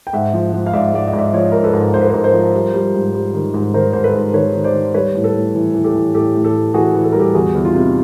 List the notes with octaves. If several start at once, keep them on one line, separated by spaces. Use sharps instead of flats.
G5
G#2 E5 F#5
F3
F3
F5
G#2 D5 E5
G#2 D5
D#5
G#2
D5 E5
F3 C#5 D#5
G#2 A#4
A4 B4
G#2
G#2 C5
B4
G#2 A#4 C5
A#4 C5
F3
G3
G3
G#2
G3
D#3
G#2
D#3 A#4 C5
G#2 C5
A4 B4
G#2
D#3 B4 C#5
D#3
C5 D5
D#3
G3 B4 C#5
A2
A4 B4
A2
E3
E3
G4 A4
E3
A2 G4 A4
A2
G4 A4
A2
E3 F#4 G#4
E3
A4
G3 A#4
G4 A4
E2 F#4 G#4
E2
D#4 F4
C3